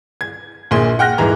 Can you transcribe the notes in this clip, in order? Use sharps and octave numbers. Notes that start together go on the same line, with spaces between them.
G#6
A#1 A#2 G#4 C6
F#5 G5 F6 F#6 A#6
D#1 G#2 E3 A#5